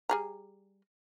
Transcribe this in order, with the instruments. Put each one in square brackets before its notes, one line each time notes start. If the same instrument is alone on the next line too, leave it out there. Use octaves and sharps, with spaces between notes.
[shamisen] G3 G#4 A#5